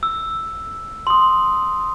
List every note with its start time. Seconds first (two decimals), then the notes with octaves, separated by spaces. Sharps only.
0.03 E6
1.07 C6 D#6